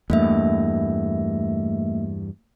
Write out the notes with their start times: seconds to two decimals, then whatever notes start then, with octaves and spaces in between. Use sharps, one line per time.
0.10 E2 G2 A3 A#3 E5